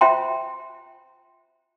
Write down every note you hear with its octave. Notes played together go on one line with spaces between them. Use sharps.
F4 C5 E5 G5 A#5 C6